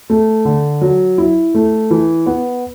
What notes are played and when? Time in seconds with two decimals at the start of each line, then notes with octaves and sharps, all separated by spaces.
0.10 A3
0.45 D3
0.81 F#3
1.18 E4
1.55 A3
1.91 E3
2.26 B3